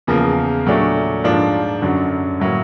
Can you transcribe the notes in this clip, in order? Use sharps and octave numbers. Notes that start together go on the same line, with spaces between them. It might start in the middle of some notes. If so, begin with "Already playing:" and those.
E2 C#3 F3 A#3
A#2 F#3 A3 D4
G#2 F3 A#3 D4 F4
F#2 D3 F#3
A2 F#3 A#3